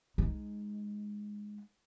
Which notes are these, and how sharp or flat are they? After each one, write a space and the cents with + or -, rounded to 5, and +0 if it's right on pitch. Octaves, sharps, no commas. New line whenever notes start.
G#3 +0 D#4 +0